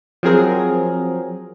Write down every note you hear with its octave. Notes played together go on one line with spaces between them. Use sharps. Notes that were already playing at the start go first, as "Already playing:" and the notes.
F3 F#3 C4 G#4 A#4